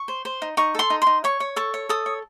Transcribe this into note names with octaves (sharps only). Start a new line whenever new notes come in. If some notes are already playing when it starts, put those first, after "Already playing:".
Already playing: C#6
C5
C5
D#4
D#4 C#6
A4 C6
D#4
D#4 C6
C#5 C#6
C#5
A4 C#6
C#5
A4 D#6
C#5